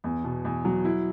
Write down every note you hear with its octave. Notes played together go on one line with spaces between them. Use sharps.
E2
B2
E2
F#3
E4